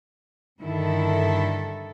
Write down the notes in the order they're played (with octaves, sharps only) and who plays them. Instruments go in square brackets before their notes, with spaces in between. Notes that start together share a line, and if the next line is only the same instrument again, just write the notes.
[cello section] G2 D3 D#3 E4 A4